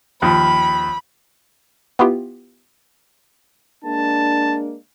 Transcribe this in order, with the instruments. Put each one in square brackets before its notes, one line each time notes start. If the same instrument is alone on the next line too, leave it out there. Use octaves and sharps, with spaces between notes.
[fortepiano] D#2 F3 [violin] B5
[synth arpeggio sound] B3 E4 F4 G4
[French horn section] G#3 A#3 D4 [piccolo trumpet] A5